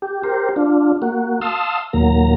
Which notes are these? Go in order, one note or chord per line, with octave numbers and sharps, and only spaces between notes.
G4
G4 A#4 C5
D4 F4
A#3 F#4
F5 A5 C6 D#6 E6
D#2 A#2 F#3 A#3 A#5